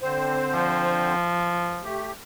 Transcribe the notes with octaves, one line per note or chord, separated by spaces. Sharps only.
D3 C4 C5
F3
A3 G4